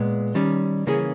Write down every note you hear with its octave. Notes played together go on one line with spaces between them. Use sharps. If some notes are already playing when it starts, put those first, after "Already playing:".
Already playing: A#2 G#3 B3
D#3 G3 C#4
C#3 E3 A#3 C#4 G#4